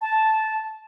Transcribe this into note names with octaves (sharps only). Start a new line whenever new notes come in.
A5